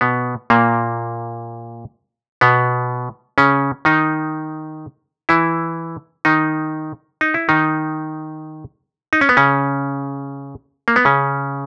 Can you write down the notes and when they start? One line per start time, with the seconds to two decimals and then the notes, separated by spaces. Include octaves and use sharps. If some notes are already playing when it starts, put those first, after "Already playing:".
0.01 B2 B3
0.50 A#2 A#3
2.41 B2 B3
3.38 C#3 C#4
3.85 D#3 D#4
5.29 E3 E4
6.25 D#3 D#4
7.21 D#4
7.34 E4
7.49 D#3 D#4
9.13 D#4
9.21 C#4
9.29 B3
9.37 C#3 C#4
10.88 A#3
10.96 B3
11.05 C#3 C#4